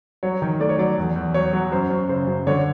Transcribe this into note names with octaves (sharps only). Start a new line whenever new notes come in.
F#3 C#5
D#3
A3 D5
C#5
F#3 D5
E2
E2
F#3 C#5
F#3
F#2 C5
F#2
C#3 C5
F#2
D3 C#5